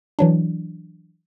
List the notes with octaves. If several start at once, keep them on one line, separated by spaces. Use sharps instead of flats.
E3 F#3 D4